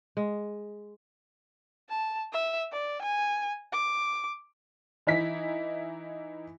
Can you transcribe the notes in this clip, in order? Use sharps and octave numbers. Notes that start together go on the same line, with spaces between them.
G#3
A5
E5
D5
G#5
D6
E3 D#4 E4 B6